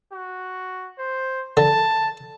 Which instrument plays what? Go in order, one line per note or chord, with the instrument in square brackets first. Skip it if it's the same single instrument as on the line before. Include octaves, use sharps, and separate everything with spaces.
[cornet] F#4
C5
[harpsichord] D3 [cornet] A5